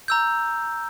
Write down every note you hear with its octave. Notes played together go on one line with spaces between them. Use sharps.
A#5 E6 G6